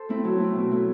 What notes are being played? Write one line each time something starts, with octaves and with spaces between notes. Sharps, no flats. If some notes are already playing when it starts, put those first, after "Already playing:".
Already playing: A4 C5
A3 C4 E4
F#3
A3 C4 E4
B2
F#3 A3 E4